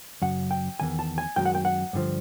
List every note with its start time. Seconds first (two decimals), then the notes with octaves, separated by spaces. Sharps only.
0.22 F#2 C#3 F#5
0.51 G5
0.80 E2 C3 D#3 G#5
0.99 A5
1.18 G#5
1.36 F#2 D#3 G#3 G5
1.45 F#5
1.55 G5
1.65 F#5
1.93 G2 D3 F3